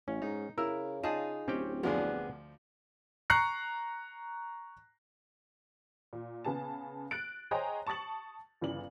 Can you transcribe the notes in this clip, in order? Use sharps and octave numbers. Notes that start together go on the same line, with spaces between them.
A1 C#4
G#2 D#4
C#3 E4 A#4 E6
D#4 F4 G#4 A5
D1 C4 C#4 G4 G5
D2 F3 B3 D4 G#4
A#5 C#6 F#6 C7 C#7
A#2
C#3 B3 G#4 A5
F#6 A6 D7
G#4 C5 C#5 D#5 G5 A#5
A5 C#6 D#6 A6 F#7
G1 C#3 E3 D5 F#7